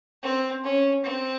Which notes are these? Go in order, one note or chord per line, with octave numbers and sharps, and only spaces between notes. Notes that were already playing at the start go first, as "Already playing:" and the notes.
C4
C#4
C4